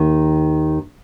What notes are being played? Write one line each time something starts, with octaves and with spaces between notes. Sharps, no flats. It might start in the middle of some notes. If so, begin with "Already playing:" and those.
Already playing: D#2 D#3